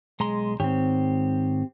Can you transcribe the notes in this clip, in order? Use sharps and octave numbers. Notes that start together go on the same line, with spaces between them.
B1 G#3 A#5 C6
G#2 D#3 C4 G4 C#5